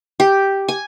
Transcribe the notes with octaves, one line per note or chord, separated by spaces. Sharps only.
G4
G#5